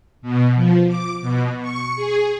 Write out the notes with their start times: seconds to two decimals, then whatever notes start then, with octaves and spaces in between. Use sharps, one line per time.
0.22 B2
0.55 F3
0.87 D6
1.22 B2
1.61 C#6
1.96 G#4